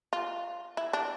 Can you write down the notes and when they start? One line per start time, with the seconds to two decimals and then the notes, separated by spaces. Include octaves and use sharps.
0.13 F4
0.77 E4
0.93 D4